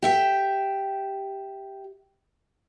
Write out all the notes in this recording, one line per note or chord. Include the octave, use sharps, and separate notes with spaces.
G4 E5 G5